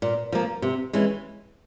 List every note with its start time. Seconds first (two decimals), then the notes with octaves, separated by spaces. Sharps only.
0.02 A#2
0.32 F3 A#3
0.62 C3
0.93 E3 G#3 C#4